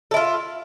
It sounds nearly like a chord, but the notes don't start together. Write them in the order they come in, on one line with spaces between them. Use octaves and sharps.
A4 E4 F4